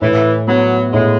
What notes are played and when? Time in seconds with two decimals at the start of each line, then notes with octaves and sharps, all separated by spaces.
0.01 A2 E3
0.48 F#3 B3
0.93 A2 G#3